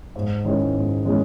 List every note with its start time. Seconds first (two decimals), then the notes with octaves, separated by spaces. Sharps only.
0.16 G#2
0.45 D#3 G#3 C#4 E4
0.74 G#2
1.05 D#3 G#3 C#4 E4